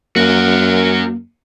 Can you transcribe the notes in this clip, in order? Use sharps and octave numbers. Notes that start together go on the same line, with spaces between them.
F#2 A#3 F#4 A#4